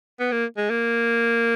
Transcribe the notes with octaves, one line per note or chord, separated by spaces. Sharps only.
B3
A#3
G#3
A#3